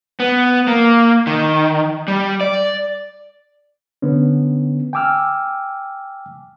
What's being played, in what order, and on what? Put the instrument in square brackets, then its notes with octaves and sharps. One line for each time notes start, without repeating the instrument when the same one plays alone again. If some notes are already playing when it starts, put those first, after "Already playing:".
[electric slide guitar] B3
A#3
D#3
G3
D5
[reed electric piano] D3 B3 C#4
G5 G#5 D6 E6 F6